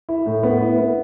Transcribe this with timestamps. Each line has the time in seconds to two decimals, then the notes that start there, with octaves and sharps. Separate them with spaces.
0.09 E4
0.26 A2
0.43 B3
0.61 E4
0.78 B3